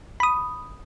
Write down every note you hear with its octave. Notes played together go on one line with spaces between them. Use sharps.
B5 D#6